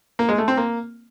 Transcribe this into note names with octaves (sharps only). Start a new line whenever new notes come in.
A#3
G#3
A3
C4
A#3